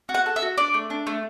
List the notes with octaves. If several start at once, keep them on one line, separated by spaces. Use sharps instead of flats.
F#4
F#5
A4
E5
F#4
D4 D5
A3
D4
A3